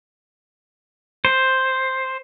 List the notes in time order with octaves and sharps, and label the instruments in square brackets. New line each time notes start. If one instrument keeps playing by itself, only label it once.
[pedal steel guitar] C5